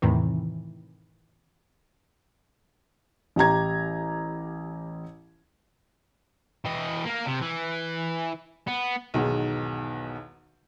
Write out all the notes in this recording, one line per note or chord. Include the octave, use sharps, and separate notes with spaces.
E2 A2 C3 D#3 E3
A1 G4 A#5 G#6
E3 D#5
A#3 A#4
C3
E3
B3
B1 E2 G#2 B2 D#3 G#3